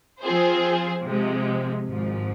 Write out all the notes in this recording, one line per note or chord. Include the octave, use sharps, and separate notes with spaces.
F3 C4 F4 G#4 C5
C3 F3 G#3
G#1 G#2 F3